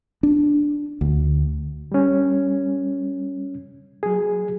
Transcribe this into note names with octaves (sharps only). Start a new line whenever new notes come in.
D4
D2
G3 C#4
F#3 G#4